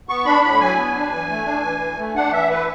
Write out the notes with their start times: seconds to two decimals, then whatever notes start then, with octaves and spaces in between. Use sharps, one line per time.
0.09 B3 C#6
0.26 D4 B5
0.43 A2 B5
0.60 F#3 G#5
0.77 B3
0.95 D4
1.11 E3
1.29 A3
1.46 D4
1.64 E3
1.81 E3
1.98 A3
2.16 D4 F#5
2.32 E3 E5
2.50 E3 B4